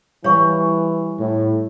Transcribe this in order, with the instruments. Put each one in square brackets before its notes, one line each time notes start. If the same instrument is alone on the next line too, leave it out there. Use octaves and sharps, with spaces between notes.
[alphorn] E3 [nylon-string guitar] G3 [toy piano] C#5 F5 C#6
[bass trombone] A2